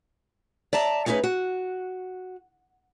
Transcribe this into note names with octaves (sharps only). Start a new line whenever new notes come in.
D5 E5 A5 A#5
A3 C#4 D#4 G#4 B4
F#4